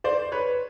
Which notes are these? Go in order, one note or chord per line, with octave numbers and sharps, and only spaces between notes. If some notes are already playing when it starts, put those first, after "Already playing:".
C5 D5
B4 C#5